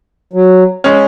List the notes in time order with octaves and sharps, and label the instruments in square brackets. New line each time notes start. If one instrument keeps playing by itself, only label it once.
[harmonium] F#3
[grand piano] G#3 C#4